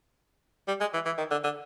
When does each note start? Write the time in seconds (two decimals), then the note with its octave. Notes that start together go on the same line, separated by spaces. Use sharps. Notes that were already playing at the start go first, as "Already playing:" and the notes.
0.68 G3
0.81 G#3
0.93 E3
1.06 E3
1.18 D#3
1.31 D3
1.44 D3